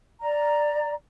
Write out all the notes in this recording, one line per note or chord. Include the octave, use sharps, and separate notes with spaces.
D5 A#5